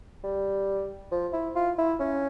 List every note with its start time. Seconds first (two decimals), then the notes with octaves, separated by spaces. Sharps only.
0.24 G3
1.12 F3
1.33 E4
1.55 F4
1.78 E4
2.00 C#4